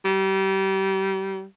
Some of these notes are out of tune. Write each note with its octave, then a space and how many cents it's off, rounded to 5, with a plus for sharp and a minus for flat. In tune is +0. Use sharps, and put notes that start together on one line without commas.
G3 -30